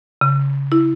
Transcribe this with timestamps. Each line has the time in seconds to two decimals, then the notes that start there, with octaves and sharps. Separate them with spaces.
0.21 C#3
0.72 E4